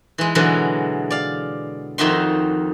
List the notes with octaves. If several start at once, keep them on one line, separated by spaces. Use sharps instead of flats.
E3 G#3
B2 D3 E3 F#3 G#3
D5 F5
F2 D#3 D#4 F#4 E5 C6